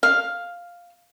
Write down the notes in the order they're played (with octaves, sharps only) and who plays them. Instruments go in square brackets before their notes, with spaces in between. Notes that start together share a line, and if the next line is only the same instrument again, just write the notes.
[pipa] F5